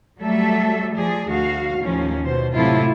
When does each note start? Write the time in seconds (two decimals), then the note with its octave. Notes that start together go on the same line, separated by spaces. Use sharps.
0.19 F#3 G3 A3 A4 E5
0.95 F3 G#4 D5
1.29 D2 F#4 F5
1.79 D#2 A2 F3 C#4
2.24 B2 C5
2.55 A2 C3 F#3 E4 F4 A4